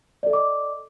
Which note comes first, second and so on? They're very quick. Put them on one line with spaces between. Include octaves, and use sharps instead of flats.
D5 A4 D#5 D6